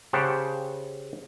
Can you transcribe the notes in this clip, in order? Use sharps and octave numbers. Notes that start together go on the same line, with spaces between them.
C#3 G4 C5 F#5 A5